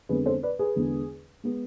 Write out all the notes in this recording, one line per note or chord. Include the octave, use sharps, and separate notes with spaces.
F2 D3 G#3 B3 G#4 B4
A4 C5
B4 D5
G#4 B4
E2 D3 G#3 B3
G#3 B3